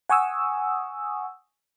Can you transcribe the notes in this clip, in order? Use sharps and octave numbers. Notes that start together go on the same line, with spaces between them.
F#5 G#5 C#6 D#6 E6